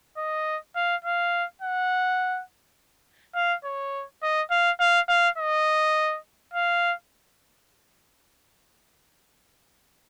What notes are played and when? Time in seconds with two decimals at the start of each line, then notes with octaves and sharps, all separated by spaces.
0.17 D#5
0.75 F5
1.04 F5
1.62 F#5
3.35 F5
3.64 C#5
4.22 D#5
4.50 F5
4.80 F5
5.09 F5
5.38 D#5
6.53 F5